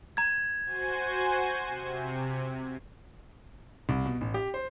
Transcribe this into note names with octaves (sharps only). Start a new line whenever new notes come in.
A#5 G#6
F#4 C5 G#5
C3
C2
B2
A1
G4
C5